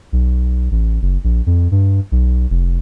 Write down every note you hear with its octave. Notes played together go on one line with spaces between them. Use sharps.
B1
A1
F#1
A#1
F2
G2
B1
F1